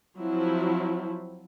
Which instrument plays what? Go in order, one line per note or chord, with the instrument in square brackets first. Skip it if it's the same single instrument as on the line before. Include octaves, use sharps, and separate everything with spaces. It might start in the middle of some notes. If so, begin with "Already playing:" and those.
[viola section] F3 F#3 C4 E4